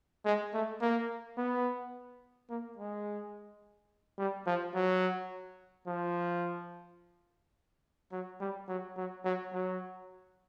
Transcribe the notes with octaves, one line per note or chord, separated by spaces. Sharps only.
G#3
A3
A#3
B3
A#3
G#3
G3
F3
F#3
F3
F#3
G3
F#3
F#3
F#3
F#3